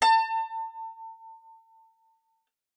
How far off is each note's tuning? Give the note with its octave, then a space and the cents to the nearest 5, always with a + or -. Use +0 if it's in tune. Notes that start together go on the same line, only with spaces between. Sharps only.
A5 +35